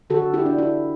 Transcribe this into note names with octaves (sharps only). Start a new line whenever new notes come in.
D3 F#4 A4
E4 G4
D4
E4